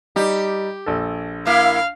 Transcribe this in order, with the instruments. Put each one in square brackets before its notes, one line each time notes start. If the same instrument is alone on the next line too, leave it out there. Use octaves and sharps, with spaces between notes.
[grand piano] G3 D#4 [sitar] G4
[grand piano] A#1 A4
[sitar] A#3 E4 [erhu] F5